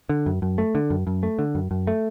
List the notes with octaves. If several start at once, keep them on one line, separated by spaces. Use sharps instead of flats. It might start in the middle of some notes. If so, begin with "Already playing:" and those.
D3
F#2
F#2
A3
D3
F#2
F#2
A3
D3
F#2
F#2
A3